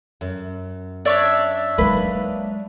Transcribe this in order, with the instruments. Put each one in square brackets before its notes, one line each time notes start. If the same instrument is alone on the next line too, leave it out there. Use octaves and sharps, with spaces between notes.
[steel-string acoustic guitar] F#2
[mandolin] D4 C#5 E5 [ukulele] D5
[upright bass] F#3 G#3 [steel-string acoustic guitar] A#3 D#4 [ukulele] B4